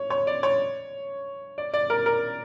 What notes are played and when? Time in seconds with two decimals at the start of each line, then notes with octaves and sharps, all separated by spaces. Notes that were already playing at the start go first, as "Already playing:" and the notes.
Already playing: C#5
0.10 C#5
0.27 D5
0.43 C#5
1.58 D5
1.74 D5
1.90 A#4
2.06 A#4